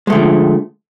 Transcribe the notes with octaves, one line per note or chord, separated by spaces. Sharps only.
D3 F3 G#3 A3